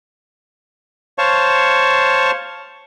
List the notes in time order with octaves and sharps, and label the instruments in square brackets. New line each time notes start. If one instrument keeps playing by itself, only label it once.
[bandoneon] C5 C#5 F5 A5 C#6